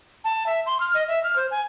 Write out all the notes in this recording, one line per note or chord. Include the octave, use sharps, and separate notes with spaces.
A5
E5
C6
F6
D#5
E5
F6
C5
G#5